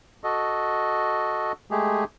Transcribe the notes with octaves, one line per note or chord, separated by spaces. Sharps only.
F#4 A4 D#5
G#3 A3 G4 G#4